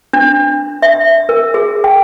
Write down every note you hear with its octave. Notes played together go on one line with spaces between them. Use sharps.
D4
E5
A#4
G#4
G5